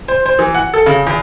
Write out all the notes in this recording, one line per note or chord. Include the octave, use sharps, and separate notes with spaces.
C5
C5
E3
F#5
A4
C#3
E2